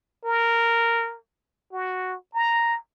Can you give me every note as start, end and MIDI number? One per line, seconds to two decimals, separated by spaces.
0.25 1.16 70
1.72 2.16 66
2.34 2.77 82